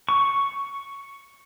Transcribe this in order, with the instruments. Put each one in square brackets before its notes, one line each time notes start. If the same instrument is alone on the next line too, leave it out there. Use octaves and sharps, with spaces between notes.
[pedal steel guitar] C#6